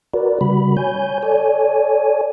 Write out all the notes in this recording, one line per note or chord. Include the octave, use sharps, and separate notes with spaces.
F#4 A#4 B4 D5
C#3 G3 F#4 B5
C#5 G#5 G6
A4 C#5 D5 G#5